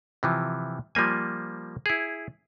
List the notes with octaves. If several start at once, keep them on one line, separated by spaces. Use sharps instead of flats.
C3 E3 F3
F3 G3 A#3 G#5
E4 G#4